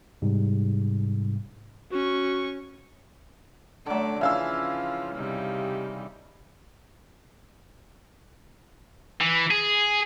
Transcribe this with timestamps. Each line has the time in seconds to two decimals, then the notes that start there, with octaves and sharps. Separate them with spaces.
0.22 G#2 C3 G3
1.92 C#4 F#4 C#6
3.86 D3 F#3 A3 D5
4.21 C#3 E3 F3 F4 E5 F5 E6
5.15 C3 G3 D#4
9.21 E3
9.51 G#4